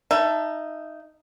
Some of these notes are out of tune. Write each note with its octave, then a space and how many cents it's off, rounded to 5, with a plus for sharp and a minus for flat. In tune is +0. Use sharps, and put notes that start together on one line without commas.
D#4 +0 E5 +25 A5 +0